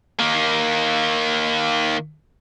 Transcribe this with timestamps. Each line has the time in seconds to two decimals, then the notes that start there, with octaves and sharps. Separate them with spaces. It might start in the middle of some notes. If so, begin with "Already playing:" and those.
0.19 D#3 A#3